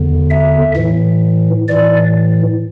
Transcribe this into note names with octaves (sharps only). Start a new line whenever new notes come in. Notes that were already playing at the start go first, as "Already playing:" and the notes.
Already playing: E2 D3
E5
A2 E3
A2 E3 D5